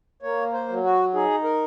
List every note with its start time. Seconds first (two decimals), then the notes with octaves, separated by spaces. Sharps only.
0.23 A#3 C#5
0.53 C5
0.68 F#3
0.84 F#4
1.14 D#4 G#4
1.44 A#4